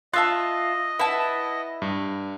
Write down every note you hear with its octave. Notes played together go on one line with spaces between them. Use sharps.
F4 D#5 E5 A5 C6 F#6 A6
E4 B4 F#5 A5
G2